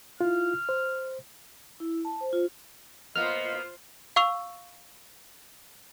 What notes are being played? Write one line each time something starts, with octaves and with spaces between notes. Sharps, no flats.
E4 F4 F6
C5
E4
A5
C5
F4
A#3 B3 F4 C5 D#5 F6
F5 C#6 E6 F7